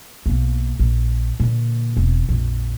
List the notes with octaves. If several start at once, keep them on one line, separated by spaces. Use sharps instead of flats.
B1 A#3
A#1
A#2 D3
E1 C4
A#1 F2